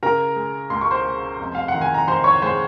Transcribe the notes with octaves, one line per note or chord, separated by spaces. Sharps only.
C#3 A#4 A#5
G#3
C#2 C6
C#6
C5 C6
G#3
F1
F5
F#5
D#3
G#5
A#5
D#3 C5 C6
C#5 C#6
G#3 C5 C6